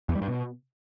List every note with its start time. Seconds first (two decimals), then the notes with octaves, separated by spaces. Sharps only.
0.09 E2
0.15 G3
0.22 G2
0.28 B2